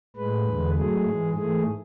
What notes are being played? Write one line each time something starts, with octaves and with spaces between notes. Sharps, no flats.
A2 G#3 B4
E2 D3 G#3
G#2 F#3 A3 G#4
G#2 E3 G#3
G#2 E3 A3 G#4